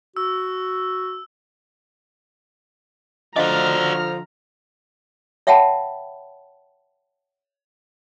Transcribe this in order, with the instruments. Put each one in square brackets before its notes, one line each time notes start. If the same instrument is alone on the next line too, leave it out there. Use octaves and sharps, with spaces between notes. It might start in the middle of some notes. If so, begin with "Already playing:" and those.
[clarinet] F#4 [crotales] E6
[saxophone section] D3 F3 [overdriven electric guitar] F#4 D5 [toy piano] D#5 F5 [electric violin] A#5 F6
[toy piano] C#5 E5 F#5 G5 A5 B5